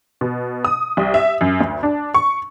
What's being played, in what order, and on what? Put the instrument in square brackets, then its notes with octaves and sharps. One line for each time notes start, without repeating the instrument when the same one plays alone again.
[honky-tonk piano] B2
D#6
C2
E5
F#2
D2
D4
C#6